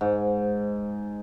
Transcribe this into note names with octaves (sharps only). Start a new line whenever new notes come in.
G#2